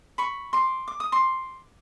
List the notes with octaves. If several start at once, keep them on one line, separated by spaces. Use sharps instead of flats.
B5 C#6
C6 D6
D6
D#6
C6 D6